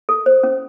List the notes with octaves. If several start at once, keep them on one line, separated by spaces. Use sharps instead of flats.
A4
C5
C#4